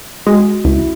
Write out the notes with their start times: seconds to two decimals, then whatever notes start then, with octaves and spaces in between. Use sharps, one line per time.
0.27 G#3 F#4
0.65 C#2 E4